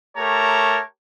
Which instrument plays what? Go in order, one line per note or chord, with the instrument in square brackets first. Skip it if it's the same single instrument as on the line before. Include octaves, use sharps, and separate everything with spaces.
[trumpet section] A3 G4 A#4 C#5 A5 A#5